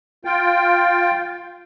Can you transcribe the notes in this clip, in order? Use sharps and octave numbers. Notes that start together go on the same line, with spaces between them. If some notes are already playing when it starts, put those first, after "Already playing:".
F4 G5